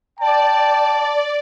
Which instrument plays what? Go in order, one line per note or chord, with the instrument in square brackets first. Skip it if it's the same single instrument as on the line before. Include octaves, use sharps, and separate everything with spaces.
[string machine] D5 [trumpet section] G5 A5